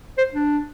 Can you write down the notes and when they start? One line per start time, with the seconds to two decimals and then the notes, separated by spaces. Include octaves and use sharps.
0.18 C5
0.33 D4